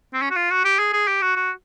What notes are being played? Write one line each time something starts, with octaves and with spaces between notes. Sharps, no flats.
C4
C#4
F#4
F4
F#4
G4
G#4
G#4
G4
F#4
F#4